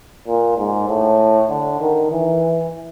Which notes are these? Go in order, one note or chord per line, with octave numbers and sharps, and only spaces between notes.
A#2
G#2
A2
D3
D#3
E3